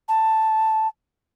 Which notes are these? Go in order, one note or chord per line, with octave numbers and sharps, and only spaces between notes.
A5